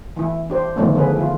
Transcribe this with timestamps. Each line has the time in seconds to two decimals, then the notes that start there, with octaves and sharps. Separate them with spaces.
0.16 E3 E4
0.50 D4 G4 C5
0.76 D3 D#3 F3 A3 B3 C#4
0.95 D3 G#4 B4
1.16 E4 F4